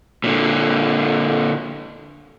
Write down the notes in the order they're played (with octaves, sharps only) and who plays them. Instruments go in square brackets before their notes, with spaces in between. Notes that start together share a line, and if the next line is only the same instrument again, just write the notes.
[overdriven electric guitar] A#2 D3